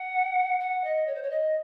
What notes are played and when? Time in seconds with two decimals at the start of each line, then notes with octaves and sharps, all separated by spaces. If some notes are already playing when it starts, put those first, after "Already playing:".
Already playing: F#5
0.60 F#5
0.83 D#5
1.06 C#5
1.14 C5
1.22 C#5
1.30 D#5